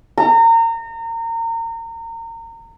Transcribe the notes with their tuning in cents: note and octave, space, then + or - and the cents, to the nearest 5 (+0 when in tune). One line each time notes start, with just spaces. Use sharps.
A#5 -30